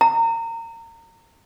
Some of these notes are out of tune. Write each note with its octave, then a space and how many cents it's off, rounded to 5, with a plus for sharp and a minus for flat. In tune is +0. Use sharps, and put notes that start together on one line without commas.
A#5 -25